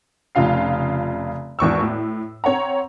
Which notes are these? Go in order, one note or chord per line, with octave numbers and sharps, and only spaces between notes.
F1 C#3 F4 F5 C7
G#1 E2 C#6 E6
A2
C4 C#5 F#5 A#5